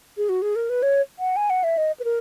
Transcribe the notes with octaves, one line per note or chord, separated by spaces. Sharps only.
G#4
F#4
G#4
A#4
B4
C#5
F#5
G#5
F#5
E5
D#5
B4
A#4